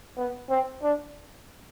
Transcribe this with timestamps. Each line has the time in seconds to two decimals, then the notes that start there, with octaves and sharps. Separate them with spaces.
0.17 B3
0.50 C4
0.83 D4